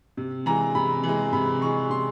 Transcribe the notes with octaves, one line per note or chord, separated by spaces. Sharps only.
C3
E3 G#3 A#5
C3 B5
E3
G#3
C3 B5
E3 G#3 C#6
C3 C6